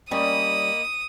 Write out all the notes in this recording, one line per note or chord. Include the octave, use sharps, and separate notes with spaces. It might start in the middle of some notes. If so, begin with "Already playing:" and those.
G3 A#3 C#4 D#5 B5 D#6